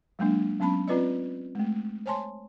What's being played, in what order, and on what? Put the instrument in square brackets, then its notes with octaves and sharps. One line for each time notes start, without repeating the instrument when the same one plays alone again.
[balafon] F#3 G#3 A#3 D4
F#3 B3 C#4 A5 B5
C4 F4 B4 D5 D#5
G#3 A3
C5 C#5 G#5 A5 C6